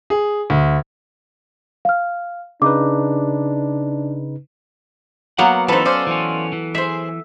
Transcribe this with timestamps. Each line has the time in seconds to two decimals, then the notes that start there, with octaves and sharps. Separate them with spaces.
0.10 G#4
0.50 D2
1.85 F5 F6
2.62 C#3 D4 D#4 B4 D6
5.38 F#3 A#3 B3 F#5
5.68 E3 C#4 D#4 A4 B4 C5
5.85 C#4 C5 D5 F5
6.07 E3 C#4
6.53 E3
6.75 G#4 C5 E5